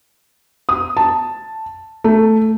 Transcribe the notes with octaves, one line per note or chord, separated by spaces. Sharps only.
D#6
A5
A3